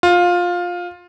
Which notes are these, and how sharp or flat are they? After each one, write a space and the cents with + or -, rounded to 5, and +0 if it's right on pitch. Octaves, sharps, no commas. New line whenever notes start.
F4 +15